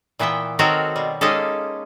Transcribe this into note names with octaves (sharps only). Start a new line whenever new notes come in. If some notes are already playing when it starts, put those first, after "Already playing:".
A#2 E3 B3 E5 G5
D#3 C4 F#4 A4 A#4 C#5
B2 G3
G#3 A#3 C#4 D#4 G4 A4